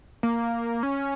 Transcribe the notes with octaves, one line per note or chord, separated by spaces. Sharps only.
A#3
C#4